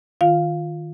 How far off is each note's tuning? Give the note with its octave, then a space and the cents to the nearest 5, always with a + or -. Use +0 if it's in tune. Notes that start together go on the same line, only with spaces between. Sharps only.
D#3 +0 F4 +0 F5 +0